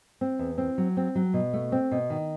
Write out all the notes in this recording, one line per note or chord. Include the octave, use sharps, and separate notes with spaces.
C4
E2
C4
F#3
C4
F#3
B2
A3
C4
B2
D#3